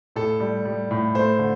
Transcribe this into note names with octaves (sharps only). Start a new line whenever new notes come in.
A2 A4
G3
G3
A2
A3 C5
D3